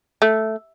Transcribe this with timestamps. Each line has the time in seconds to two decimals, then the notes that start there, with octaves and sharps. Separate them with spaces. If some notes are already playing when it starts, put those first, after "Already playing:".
0.22 A3